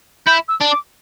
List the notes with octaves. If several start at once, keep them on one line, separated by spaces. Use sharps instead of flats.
E4 G6
E6
D4
D6